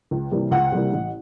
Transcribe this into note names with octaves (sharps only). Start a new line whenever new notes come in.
C#2
C3 E3 G3 A#3
C#2 F#5
C3 E3 G3 A#3
A1